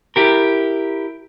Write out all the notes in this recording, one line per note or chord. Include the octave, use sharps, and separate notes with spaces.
E4 G4 A#4